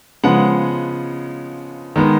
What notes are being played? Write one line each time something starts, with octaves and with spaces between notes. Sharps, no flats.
C#3 F3 G#3 B3 F#5
D#3 G#3 B3